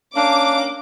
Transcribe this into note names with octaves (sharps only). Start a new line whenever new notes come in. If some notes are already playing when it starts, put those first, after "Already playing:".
A#3 C#4 D4 D6